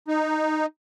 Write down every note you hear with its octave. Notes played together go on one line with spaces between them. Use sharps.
D#4